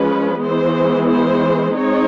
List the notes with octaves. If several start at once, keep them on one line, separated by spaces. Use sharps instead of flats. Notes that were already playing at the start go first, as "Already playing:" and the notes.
Already playing: F3 G#3 C#4 B4
E3 G#3 B3 C5
C5
G#3 C4 D#4 C#5